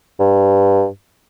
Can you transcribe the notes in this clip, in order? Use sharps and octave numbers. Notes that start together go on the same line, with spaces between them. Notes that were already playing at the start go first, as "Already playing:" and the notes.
G2